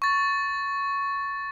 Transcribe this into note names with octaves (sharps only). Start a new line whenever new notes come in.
C#6 A6